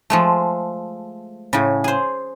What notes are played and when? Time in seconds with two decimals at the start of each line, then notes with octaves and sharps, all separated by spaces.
0.10 F3 G#3 A3
1.53 A2 C#3
1.84 G#4 C5